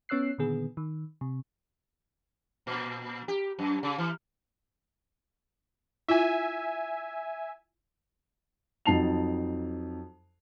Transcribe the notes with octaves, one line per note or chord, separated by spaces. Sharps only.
B3 C#4 C#5 E6 F#6 C7
A#2 D3 D#3 B3 G#4
D#3
C3
A#2
G4
F#2
C#3
E3
E4 F4 E5 G#5
F2 F#3 D#4 A5 C7 F7